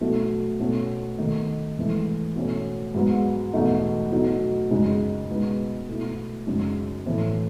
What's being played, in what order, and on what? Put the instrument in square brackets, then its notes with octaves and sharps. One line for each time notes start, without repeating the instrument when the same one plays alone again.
[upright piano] B2 F#3 A3
B2 A3 C#4
D#3 A3 D#4
G#2 E3 A3
B2 A3 C#4
G#2 F#3 B3
E2 B2 A3 D#4
B2 F#3 A3 D#4
F#2 C#3 G#3 D#4
B2 G#3 B3 D#4
B2 A3 E4
F#2 C#3 G#3 D#4
A2 E3 A3